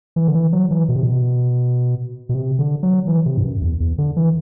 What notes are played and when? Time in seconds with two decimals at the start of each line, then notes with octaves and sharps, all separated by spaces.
0.16 E3
0.28 D3
0.34 E3
0.53 F#3
0.71 E3
0.89 B2
0.96 C3
1.03 B2
2.29 B2
2.34 C3
2.59 D3
2.83 F#3
3.07 E3
3.26 C3
3.37 G2
3.44 F#2
3.62 E2
3.80 E2
3.98 D3
4.17 E3